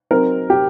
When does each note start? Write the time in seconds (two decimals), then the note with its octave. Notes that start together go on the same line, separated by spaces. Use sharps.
0.11 F#3 C4 D#4 A#4
0.50 G4